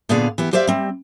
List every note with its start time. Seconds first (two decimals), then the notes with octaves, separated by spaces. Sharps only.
0.09 A#2 D3 B3 G#4 D5 F5
0.38 E3 B3 G4
0.53 G4 C5 D5 E5 F5
0.67 G3 C4